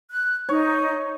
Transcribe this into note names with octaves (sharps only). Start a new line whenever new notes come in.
F#6
D#4 C#5